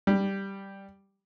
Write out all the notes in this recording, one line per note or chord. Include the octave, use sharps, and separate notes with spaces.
G3